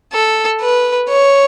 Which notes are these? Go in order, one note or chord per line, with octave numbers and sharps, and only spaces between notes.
A4
B4
C#5